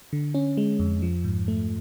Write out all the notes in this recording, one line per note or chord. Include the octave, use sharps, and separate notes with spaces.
D3
C#4
G#3
F2
F3
G#2
A3